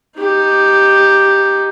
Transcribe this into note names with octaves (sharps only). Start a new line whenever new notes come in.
D#4 G4